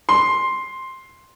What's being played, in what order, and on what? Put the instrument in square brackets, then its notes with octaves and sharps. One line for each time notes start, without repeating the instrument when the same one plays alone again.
[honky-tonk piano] C6